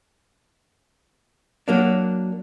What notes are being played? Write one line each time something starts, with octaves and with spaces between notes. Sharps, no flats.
F#3 A#3 D4